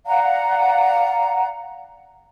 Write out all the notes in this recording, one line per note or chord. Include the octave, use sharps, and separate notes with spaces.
D5 F5 F#5 A#5